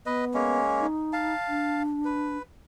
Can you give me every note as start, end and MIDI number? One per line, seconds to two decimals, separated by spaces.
0.06 0.61 59
0.06 0.25 71
0.06 0.25 75
0.34 0.87 56
0.34 0.87 58
0.34 0.87 61
0.80 1.34 63
1.13 1.83 77
1.13 1.83 81
1.48 2.38 62
2.05 2.42 71